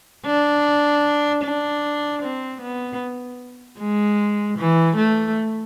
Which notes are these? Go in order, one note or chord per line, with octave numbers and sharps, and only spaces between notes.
D4
D4
C4
B3
G#3
E3
A3